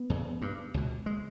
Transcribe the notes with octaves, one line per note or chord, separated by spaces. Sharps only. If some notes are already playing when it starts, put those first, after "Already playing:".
Already playing: B3
E2 C#3
G2
C#2 B2
G#3